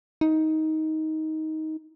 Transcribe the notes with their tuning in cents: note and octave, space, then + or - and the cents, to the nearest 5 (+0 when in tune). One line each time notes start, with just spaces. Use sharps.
D#4 +15